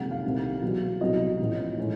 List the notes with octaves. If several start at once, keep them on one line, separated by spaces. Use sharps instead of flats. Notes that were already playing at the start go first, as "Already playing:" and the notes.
Already playing: F#1 F2 C3 D#3 G#3 F#5
F5
C2 C3 D#3 G3
E2 B2 F#3
C2 B2 F#3 D#5
A1 A2 F3
A2 E3 G#3